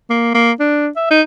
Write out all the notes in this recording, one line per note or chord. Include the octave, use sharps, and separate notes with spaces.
A#3
A#3
D4
E5
D#4